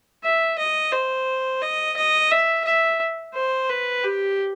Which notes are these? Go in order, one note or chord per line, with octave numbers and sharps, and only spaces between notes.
E5
D#5
C5
D#5
D#5
E5
E5
C5
B4
G4